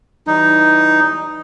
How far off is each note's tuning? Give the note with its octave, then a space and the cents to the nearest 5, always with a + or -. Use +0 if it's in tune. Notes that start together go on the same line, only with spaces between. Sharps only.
E3 +0 G3 -20 D#4 +0